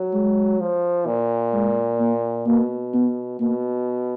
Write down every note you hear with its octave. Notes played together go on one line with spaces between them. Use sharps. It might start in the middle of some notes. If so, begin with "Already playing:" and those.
Already playing: F#3
G#3
F3
A#2
G#3
A#3
B2 A#3
B3
B2 A#3